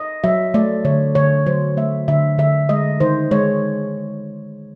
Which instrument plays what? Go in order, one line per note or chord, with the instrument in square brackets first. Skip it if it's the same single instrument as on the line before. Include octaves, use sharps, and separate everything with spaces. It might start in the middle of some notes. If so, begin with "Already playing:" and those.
Already playing: [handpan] D#5
F#3 E5
A3 D5
D3 C#5
D3 C#5
F#3 C5
A3 E5
D3 E5
D3 E5
G#3 D#5
D#3 C5
G#3 C#5